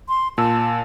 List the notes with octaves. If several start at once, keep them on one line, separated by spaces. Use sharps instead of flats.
C6
A#2 A5 E6